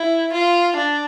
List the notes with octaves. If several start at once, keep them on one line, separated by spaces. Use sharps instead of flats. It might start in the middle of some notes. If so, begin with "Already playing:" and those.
Already playing: E4
F4
D4